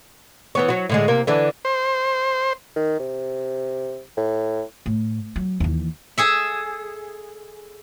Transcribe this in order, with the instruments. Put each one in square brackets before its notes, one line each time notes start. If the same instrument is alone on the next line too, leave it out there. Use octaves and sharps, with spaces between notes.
[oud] E3 B3 C#5
F#3 F#4
A2 D3 G#3
C3 A#3 A#4
D3 E3 D4
[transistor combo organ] C5
[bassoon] D#3
C3
A2
[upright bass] A2
F#3
D#2 E3
[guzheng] G#4 A4 E5